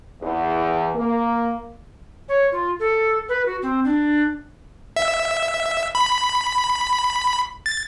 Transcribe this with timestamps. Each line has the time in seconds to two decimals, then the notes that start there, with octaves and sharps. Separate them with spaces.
0.21 E2
0.95 A#3
2.29 C#5
2.52 F4
2.80 A4
3.29 B4
3.46 F#4
3.62 C4
3.85 D4
4.96 E5
5.95 B5
7.66 A6